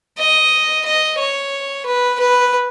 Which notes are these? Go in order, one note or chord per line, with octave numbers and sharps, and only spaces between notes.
D#5
D#5
C#5
B4
B4